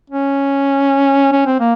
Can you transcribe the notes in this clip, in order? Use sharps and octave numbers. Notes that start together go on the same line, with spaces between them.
C#4
C#4
C4
A#3